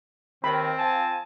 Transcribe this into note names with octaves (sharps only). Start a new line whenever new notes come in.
D#2 D#3 C4 B5
F3 G#5 A5